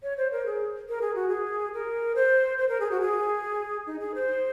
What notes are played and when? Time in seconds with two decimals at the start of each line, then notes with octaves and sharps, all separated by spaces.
0.03 C#5
0.18 C5
0.32 A#4
0.46 G#4
0.89 A#4
1.02 G#4
1.15 F#4
1.28 G#4
1.74 A#4
2.16 C5
2.58 C5
2.69 A#4
2.80 G#4
2.91 F#4
3.01 G#4
3.87 D#4
4.00 G#4
4.15 C5